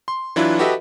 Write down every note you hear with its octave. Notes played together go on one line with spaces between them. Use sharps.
C6
E3 F#3 D4 E4 F4 B4
F#4 G4 A4 B4 D#5 E5